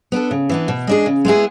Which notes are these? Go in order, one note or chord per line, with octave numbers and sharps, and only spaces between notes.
B3 D4 A4
C#3
E3 B3 D4
B2
G#3 D4 G#4
C#3
G#3 B3 E4 G#4